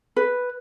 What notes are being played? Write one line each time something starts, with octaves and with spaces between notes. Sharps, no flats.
B4